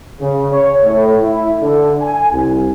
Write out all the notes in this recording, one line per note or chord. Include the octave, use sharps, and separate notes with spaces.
C#3
C#5
A2
E4
D3
G#5
C2